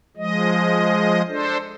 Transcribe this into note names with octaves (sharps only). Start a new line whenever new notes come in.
F3 G#3 D#5
D4 A4 C5